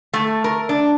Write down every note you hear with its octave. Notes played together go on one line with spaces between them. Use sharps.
A3
A#4
D4